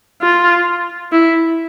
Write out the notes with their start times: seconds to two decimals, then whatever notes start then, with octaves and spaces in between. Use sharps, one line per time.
0.22 F4
1.12 E4